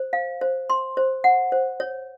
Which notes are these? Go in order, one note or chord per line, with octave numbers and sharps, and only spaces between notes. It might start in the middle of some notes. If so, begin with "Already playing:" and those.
Already playing: C5
F5
C5
C6
C5
F#5
C5
C#5